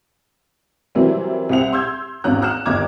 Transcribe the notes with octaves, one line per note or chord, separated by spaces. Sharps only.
C3 E3 F#3 G3 A#3 C4
C2 C4 E5 F#5 F7
C6 E6 G6 G#6
G#1 E2 C#4 A#5 F#6
A#5 F6 F#6 E7
G1 D#2 A#5 D6 G#6